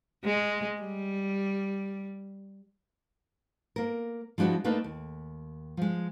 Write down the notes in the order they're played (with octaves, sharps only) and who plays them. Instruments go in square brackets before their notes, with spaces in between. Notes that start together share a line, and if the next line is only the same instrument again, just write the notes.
[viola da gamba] G#3
G3
[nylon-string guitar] A#3 A#4
F3 G#3 D4 E4 F#4
A3 A#3 D4 D#4 B4
D#2
F3 G#3